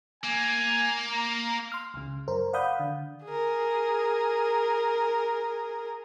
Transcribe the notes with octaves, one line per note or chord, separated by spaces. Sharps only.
A#3 G#5
A#5
C6 F6
C#2 C#3
F#2 A#4 C5
D5 F5 F#5 B5 D#6 G6
D3
G#4 A#4